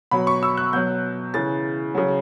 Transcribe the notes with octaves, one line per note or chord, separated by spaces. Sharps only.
B2 F#3 B5
C#6
E6
F#6
B2 F#3 G6
C#3 E3 A6
C#3 F#3